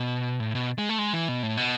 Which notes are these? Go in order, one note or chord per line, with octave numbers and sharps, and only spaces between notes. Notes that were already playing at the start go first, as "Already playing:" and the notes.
Already playing: B2
A2
B2
G#3
A3
G#3
E3
B2
A2
B2